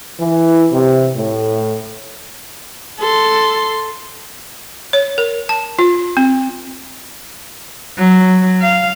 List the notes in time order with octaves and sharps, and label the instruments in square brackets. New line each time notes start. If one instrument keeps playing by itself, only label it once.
[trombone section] E3
C3
A2
[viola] A4 C6
[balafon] C#5
A#4
A5
F4
C4
[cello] F#3
F5